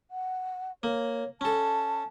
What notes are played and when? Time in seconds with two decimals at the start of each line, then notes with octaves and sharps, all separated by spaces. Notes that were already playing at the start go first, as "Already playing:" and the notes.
0.11 F#5
0.83 A#3 C#5
1.41 C#4 A4 A5